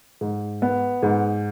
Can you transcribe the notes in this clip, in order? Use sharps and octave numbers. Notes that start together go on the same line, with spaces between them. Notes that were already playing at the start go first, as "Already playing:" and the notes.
G#2
B3
G#2